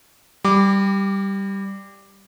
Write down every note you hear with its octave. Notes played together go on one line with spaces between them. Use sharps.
G3 D6